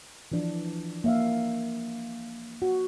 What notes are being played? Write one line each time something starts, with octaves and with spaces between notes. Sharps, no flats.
E3 F3 D4
A#3 E5 F5
F#4